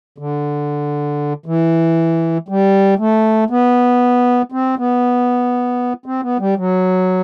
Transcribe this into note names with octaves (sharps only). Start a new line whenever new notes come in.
D3
E3
G3
A3
B3
C4
B3
C4
B3
G3
F#3